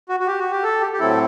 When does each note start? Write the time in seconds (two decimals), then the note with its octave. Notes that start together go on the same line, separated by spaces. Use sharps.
0.09 F#4
0.20 F#4
0.27 G4
0.39 F#4
0.51 G4
0.63 A4
0.81 G4
0.93 G4
0.99 A2 F#3 C4 E4 A4